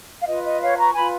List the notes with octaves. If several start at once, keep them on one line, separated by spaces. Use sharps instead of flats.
F5
F4 B4 D#5
D#5
C#5 F5
A#5 C#6
F4 B4 G#5 B5